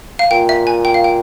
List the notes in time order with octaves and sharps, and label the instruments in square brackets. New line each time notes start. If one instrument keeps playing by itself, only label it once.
[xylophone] F5
[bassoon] A#2 [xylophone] G5
[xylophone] E5
G#5
G5
F5
G5